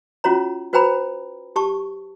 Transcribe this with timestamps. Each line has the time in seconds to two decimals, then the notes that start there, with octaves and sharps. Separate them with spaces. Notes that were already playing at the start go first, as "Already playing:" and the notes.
0.24 C#4 F4 F#4 C#5 A#5
0.73 F#4 B4 C5 G5 A#5 B5
1.56 G4 A5 C#6